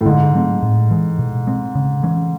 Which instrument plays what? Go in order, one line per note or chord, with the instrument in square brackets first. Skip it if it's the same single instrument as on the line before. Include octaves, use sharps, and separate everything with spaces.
[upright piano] A2
[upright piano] G#2 [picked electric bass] D3
[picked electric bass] F#3 A3 C4
A2
E3 G#3
B2
G#3 C4
C#3
E3 G#3 C#4